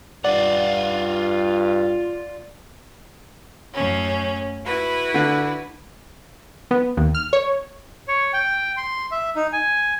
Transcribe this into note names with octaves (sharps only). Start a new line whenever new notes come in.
G2 F4 D5 F#5
F#2 A2 C#4
E4 F#4 B4
D3
B3
D#2
F6
C#5
C#5
G5
C6
E5
D#4
G#5